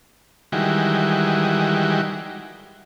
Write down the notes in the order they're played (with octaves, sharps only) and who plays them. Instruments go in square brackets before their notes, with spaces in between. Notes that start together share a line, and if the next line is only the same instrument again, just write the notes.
[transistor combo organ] D#3 E3 G3 G#3 F#4